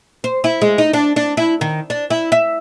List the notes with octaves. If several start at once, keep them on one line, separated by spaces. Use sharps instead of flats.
C5
E4
G#3
D#4
D4
D4
E4
D#3
D4
E4
E5